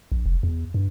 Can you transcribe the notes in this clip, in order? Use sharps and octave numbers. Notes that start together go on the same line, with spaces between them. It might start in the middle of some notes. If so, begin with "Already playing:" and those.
A#1
F1
E2
G2